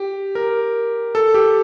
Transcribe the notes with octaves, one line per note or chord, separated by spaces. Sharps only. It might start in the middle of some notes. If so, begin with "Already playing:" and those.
Already playing: G4
A#4
A4
G4